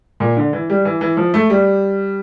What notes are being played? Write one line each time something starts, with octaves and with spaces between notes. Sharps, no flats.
A#2
D3
E3
G3
E3
E3
F3
A3
G3